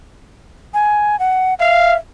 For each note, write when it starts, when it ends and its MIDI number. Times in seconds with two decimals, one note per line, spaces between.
0.74 1.19 80
1.19 1.54 78
1.60 1.95 76
1.60 1.94 77